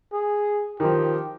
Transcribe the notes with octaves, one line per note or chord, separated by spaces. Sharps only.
G#4
D#3 F3 G4